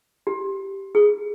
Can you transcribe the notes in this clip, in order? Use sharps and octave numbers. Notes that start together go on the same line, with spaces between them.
G4
G#4